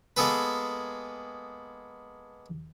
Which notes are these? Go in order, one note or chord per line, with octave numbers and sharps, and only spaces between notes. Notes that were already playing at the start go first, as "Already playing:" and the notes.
G#3 A#3 B3 G#4 A4 B4